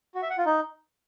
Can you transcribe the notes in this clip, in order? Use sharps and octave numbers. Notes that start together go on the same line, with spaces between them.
F#4
E5
F#5
F4
D#4